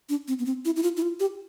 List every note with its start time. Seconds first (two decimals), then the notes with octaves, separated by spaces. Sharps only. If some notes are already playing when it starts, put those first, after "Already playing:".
0.09 D4
0.28 C4
0.39 B3
0.46 C4
0.65 E4
0.76 E4
0.83 F4
0.97 E4
1.02 F4
1.20 G4